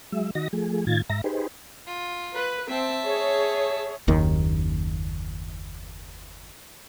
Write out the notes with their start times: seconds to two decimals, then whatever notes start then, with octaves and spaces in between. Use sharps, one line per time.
0.12 F#3 G#3 E5
0.35 D#3 F#4 D#5 A#6
0.53 F3 A3 G#4
0.87 A2 D#3 F4 G#6 A6
1.09 G#2 E5 A#5 A#6
1.24 D#4 G4 G#4 B4 C5
1.87 F4
2.34 B4
2.69 C4 E5 A5
3.05 G#4 C#5
4.08 F#1 D#2 D#3